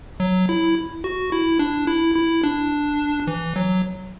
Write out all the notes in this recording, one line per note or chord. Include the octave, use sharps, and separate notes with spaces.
F#3
E4
F#4
E4
D4
E4
E4
D4
E3
F#3